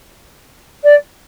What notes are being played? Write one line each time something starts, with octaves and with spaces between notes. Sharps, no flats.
D5